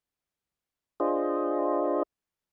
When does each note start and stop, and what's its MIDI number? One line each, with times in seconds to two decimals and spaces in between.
1.00 2.03 62
1.00 2.03 65
1.00 2.03 68
1.00 2.03 72
1.00 2.03 75